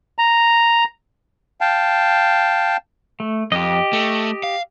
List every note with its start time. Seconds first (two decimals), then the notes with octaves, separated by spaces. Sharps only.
0.19 A#5
1.61 F5 G5 A5
3.20 A3
3.52 F2 G4 D#5
3.93 A3
4.43 F5